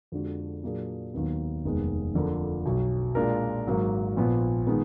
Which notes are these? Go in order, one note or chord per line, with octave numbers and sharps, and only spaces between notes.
F2 D3 G#3 D4 F#4
A#2 F#3 A#3 D4 G#4
D#2 D#3 F#3 B3
F1 D#2 D#3 G#3 B3
F2 D3 F3 A#3
B1 B2 F#3
A#2 G#3 D4 F4 A#4
G#1 G#2 F#3 A#3
A#1 A#2 F3 B3
D#3 G#3 B3